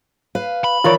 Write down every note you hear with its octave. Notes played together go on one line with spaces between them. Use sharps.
B4 F5
B5
D#3 E3 F4 A#4 C#5 D5